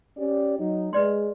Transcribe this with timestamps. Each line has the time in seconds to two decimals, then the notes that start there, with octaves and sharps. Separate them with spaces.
0.18 C#4 G4 D5
0.59 F#3 D#4
0.93 G#3 B4 D5 C6